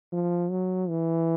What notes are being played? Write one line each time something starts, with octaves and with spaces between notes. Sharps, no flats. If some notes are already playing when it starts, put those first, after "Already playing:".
F3
F#3
E3